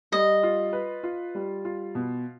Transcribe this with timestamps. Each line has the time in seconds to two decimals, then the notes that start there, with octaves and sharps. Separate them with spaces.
0.12 G3 D#5
0.43 F4
0.73 B4
1.03 F4
1.35 G3
1.65 F4
1.95 B2